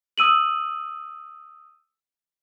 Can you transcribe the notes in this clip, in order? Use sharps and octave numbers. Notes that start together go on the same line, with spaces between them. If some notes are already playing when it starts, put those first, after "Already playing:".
D#6 E6 D#7 F#7